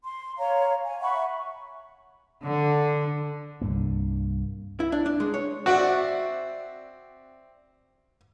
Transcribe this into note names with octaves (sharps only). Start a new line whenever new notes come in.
C6
C#5 F5 A#5
G#5
E5 F#5 B5 C#6
D3
C2 G2 A#3
E4
D4
D4
G#3
C#5
C4 F#4 D5 E5